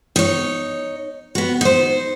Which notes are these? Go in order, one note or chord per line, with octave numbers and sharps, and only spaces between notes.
D#4 C#5
B3 F#4
D#4 C5